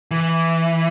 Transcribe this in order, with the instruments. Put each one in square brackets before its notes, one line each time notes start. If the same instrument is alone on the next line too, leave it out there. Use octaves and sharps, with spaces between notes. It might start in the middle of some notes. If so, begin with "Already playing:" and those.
[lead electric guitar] E3